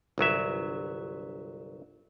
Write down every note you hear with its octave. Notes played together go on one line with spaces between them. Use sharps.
G1 C2 F#3 E5